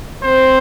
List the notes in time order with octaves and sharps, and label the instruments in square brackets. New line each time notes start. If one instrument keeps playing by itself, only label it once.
[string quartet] C4 [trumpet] C5